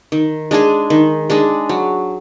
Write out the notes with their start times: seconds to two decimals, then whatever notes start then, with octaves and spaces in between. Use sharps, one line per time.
0.12 D#3
0.51 G#3 D4 G#4
0.90 D#3
1.30 G#3 D4 G#4
1.69 F#3